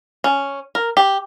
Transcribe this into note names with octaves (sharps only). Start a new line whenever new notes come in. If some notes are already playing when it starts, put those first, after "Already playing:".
C#4
A#4
G4